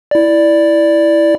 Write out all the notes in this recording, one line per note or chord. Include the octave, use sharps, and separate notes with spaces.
E4 D5